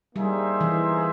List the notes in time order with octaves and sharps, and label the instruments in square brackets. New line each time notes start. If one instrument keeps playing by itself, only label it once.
[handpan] G3 [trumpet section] A#3 D#4 G#4 C5 E5
[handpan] E3